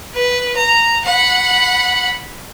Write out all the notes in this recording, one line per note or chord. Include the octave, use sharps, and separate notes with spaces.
B4
A#5
F#5 B5